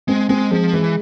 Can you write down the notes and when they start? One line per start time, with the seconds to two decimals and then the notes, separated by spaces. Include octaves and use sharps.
0.08 G#3 C4
0.29 G#3 C4
0.51 F3 G#3
0.73 E3 G#3